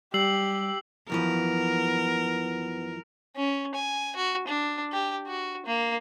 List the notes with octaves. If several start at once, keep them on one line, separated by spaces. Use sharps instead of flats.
G3 G4 E6 C7 F#7
F#2 E3 F3 B3 A#4
C#4
G#5
F#4
D4
G4
F#4
A#3